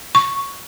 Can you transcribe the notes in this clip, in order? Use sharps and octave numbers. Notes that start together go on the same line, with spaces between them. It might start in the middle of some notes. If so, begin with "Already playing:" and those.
C#6